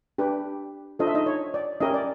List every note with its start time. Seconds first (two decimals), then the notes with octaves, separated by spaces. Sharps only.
0.18 D4 G4 B4
0.99 D4 F4 A4 C5 D#5
1.07 E5
1.15 D#4 D#5
1.26 C#5
1.54 D5
1.80 C#4 E4 G4 A#4 D#5
1.94 D5